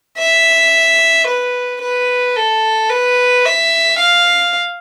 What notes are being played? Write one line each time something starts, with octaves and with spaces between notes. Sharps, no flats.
E5
B4
B4
A4
B4
E5
F5